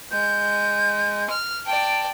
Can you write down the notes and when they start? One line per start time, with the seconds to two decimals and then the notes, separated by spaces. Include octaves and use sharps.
0.11 G#3 G6
1.30 F6
1.66 D5 G5 A5